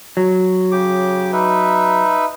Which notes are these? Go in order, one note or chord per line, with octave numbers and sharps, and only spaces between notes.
F#3
C#3 G4 D6
D#4 B4 E5